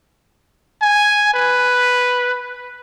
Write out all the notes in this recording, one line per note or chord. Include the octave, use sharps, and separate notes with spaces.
G#5
B4